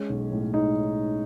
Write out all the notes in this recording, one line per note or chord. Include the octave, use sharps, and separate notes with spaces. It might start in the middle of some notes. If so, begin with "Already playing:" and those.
Already playing: G#3 C#4
B1
A2
G#3 D#4